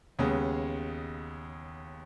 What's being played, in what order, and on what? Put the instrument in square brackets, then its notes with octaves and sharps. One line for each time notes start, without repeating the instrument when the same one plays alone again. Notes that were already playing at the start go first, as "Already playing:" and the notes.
[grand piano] D#2 C#3 G#3 B3